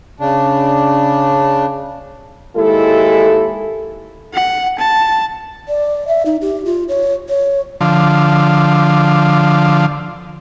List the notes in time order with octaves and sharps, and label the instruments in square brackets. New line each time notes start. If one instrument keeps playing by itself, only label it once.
[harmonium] C#3 D4
[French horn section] D#2 G#3 E4 G4 A4
[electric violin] F#5
A5
[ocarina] D5
E5
D#4
G4
F4
C#5
C#5
[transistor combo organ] D3 F3